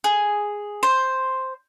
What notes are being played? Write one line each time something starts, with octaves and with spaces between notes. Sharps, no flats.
G#4
C5